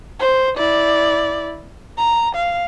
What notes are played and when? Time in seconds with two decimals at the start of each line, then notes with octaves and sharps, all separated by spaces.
0.20 C5
0.57 E4 D5
1.98 A#5
2.36 F5